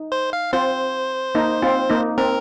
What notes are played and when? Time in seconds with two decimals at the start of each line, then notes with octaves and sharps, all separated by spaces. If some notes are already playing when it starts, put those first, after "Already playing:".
Already playing: D#4
0.12 C5
0.33 F5
0.53 C4 F4 C5
1.35 A#3 D#4
1.62 C4 F4
1.90 A#3 D#4
2.18 C4 A#4